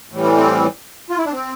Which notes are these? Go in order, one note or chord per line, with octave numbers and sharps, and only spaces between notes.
A2 E3 G3
C4
C4
F4
E4
D4
C4